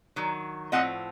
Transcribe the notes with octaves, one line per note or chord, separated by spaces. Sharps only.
D#3 F#3
A2 F3 A3 C4 D#5 F#5